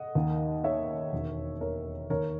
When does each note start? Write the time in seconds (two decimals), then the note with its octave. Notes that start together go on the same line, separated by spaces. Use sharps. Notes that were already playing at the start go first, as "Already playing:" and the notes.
Already playing: D#5 F#5
0.15 D#2 D#3
0.64 C#5 E5
1.13 E1 D#2 D#3
1.61 A#4 C#5
2.10 D#2 D#3 A#4 C#5